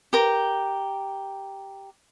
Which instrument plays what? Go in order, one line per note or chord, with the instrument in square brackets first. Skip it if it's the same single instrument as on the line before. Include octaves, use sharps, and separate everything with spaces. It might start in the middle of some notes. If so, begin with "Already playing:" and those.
[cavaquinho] G4 A#4